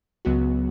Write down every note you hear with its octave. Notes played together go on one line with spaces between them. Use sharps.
C#2 C#3 F#3 B3 F#4